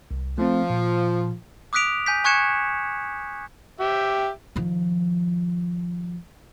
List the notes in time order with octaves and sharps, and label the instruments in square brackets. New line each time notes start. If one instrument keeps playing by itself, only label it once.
[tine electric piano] C2
[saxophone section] F3 [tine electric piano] A3 C4
[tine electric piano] A#2
[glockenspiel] D6 D#6 F#6 B6 D7 F7
G#5 G6 B6
G#5 C#6 F#6 G#6 C#7 E7
[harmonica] G4 E5
[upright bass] D#3 F3